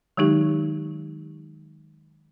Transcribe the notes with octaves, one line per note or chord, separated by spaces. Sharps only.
D#3 F#3 G#3 D#4 G4